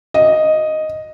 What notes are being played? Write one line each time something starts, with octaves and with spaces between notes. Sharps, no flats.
D#5